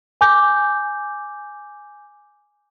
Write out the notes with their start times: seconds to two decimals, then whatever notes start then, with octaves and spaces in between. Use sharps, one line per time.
0.21 G#5 D6 G6